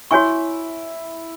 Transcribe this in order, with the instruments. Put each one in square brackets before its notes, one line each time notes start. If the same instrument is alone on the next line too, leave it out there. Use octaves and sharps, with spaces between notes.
[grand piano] E4 [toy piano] F#4 C#5 G#5 C#6